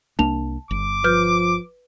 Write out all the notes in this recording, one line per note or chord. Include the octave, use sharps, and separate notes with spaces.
C2 A#3 D4 A5 F7
G1 D6
F3 B4 F6 G6